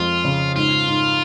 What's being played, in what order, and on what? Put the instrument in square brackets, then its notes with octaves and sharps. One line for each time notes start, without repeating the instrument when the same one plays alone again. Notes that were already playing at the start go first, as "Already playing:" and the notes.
Already playing: [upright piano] F2 G#3 [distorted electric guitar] F4
[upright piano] C#3
[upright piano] G#2 [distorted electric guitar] F4
[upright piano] G#2